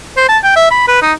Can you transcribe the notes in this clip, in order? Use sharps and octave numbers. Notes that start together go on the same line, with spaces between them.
C5
A5
G5
E5
B5
B4
D#4